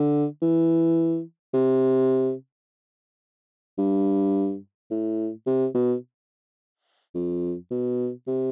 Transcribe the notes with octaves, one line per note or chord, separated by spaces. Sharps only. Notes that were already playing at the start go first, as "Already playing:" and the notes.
Already playing: D3
E3
C3
G2
A2
C3
B2
F2
B2
C3